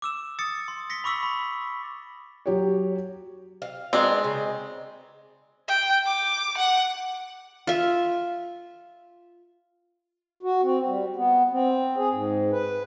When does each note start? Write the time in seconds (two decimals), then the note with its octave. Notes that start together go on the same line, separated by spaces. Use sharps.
0.02 D6 E6 E7
0.39 D#6 A6 C#7
0.68 C6
0.90 A#6 B6 C#7 G7
1.04 B5 C#6 D6 E6 B6 F#7
1.23 B5
2.46 F#3 G4 C#5
3.62 F5
3.93 G#3 B3 C4 D4 D#4
4.24 C#3
5.68 G5
6.06 D6
6.57 F#5
7.67 F4 E5
10.43 F#4
10.62 C4
10.86 G3
11.16 B3
11.51 C4
11.97 G#4
12.12 G#2
12.51 B4